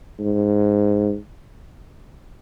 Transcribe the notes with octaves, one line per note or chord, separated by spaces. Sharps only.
G#2